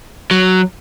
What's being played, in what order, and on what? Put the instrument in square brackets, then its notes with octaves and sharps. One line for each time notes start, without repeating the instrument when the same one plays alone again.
[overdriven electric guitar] F#3